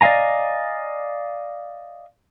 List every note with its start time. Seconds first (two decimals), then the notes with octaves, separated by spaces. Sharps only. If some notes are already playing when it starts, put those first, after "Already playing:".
0.01 D5 D#5 F5 G#5 A#5